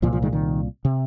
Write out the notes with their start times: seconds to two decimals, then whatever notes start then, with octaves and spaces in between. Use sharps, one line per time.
0.02 C2 A#2 F3
0.13 F3
0.22 D#3 G#3
0.33 D#3
0.85 C3